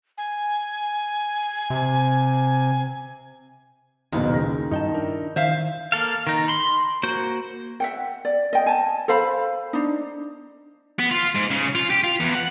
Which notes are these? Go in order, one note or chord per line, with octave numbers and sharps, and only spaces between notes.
G#5
C3
F#1 D#2 B2 D#3
C#3 A#6
G2 D#4 G5 A5
D4 E4 A#4
D#3 C5 E5 F5
A#3 A4 F5
D#3 D#4
B5 C6
A#3 F#4 C5
E5 F#5 G5
D5
D#5 G5
G#5 A5
A4 C5 F5 B5
D4 D#4
B3
F4
G#2
C#3
F4
G4
F4
E2
F#5